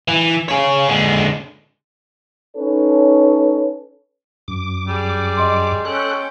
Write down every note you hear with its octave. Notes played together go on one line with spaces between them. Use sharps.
E3
G#4 C#5
D3 G#3
C#4 D#4 A4 B4 C#5
F#2 D6
G3 G#4
D#5 C6
C#4 A4 G5 F#6